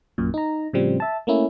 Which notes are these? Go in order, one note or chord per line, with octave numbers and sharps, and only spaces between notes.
A#1 F#2 A#2
D#4 A#5
A2 C#3 F3 G3 C4
E5 A5
A3 A#3 C#4 E4